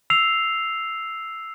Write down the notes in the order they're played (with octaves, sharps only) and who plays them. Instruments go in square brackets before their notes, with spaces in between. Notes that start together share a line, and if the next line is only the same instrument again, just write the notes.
[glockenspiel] E6 C7 F7